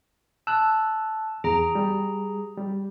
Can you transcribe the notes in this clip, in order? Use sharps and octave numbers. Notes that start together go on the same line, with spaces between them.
A5 E6 F#6
E2 G#4 A#5
G3
G3